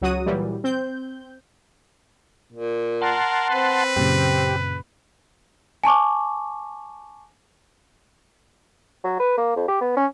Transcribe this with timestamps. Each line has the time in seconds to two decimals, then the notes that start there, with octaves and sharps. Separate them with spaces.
0.01 C#2 F#3 F#4 D#6
0.26 A#2 E3 F#3 G3
0.64 C4 G6
2.52 A#2
3.02 A#4 F#5 A5 C6
3.50 C4 B4
3.96 F#2 A#2 C#3 G4
5.84 G#5 A5 C#6 D6
9.04 F#3
9.20 B4
9.38 A#3
9.56 F2
9.68 G4
9.81 B3
9.97 C#4